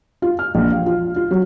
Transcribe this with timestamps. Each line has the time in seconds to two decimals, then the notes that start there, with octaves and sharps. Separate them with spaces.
0.22 F4
0.39 F6
0.55 A#1
0.71 F5
0.86 F4
1.16 F4
1.31 F#3